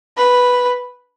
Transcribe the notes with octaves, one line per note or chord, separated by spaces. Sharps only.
B4